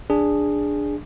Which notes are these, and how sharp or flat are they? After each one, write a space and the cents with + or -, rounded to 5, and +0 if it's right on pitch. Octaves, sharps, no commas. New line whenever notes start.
D4 +0 G#4 -10